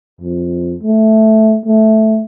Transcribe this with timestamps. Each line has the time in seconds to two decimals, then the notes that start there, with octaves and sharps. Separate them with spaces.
0.21 F2
0.83 A3
1.66 A3